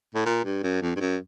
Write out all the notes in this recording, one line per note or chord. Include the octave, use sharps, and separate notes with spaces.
A2
A#2
G2
F#2
F2
G2
F#2